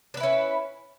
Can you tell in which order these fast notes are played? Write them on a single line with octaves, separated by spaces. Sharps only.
D4 B4 E4 C#4